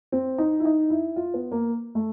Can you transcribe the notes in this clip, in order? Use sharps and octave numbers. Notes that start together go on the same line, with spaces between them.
C4
D#4
E4
D#4
E4
F4
B3
A#3
A3